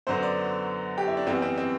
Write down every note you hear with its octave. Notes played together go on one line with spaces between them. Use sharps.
F#2 D3 F#3 B3 C5
D5
G4
E4
D4
F#2 E3 G3 B3 C4
C4
C4